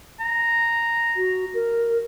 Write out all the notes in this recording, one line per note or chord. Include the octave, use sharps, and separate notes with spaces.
A#5
F#4
A#4